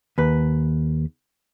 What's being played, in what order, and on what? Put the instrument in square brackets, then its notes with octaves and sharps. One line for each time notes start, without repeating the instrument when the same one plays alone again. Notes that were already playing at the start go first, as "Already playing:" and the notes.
[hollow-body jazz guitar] D#2 B4